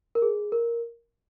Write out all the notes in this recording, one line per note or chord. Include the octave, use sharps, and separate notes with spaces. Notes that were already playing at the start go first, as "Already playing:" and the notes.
A#4
G#4
A#4